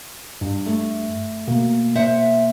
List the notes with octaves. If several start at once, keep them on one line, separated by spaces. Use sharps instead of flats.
G2
A3
B2 A#3
C5 E5 F#5